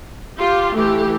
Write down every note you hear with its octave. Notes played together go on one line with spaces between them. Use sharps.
F4 G4
E3 A3 G4